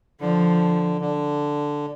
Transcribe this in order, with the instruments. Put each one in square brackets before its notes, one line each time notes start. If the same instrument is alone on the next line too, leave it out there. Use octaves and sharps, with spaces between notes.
[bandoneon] D3 [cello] F3
[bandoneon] D3